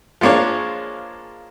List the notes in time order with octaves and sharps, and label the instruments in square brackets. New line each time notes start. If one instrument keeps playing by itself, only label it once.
[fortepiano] F3 G#3 A#3 D4 C#5